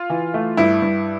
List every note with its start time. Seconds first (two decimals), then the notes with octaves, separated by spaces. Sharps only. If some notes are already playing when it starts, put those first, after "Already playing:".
Already playing: F4
0.10 E3
0.34 A3
0.57 G2 E4
0.82 G2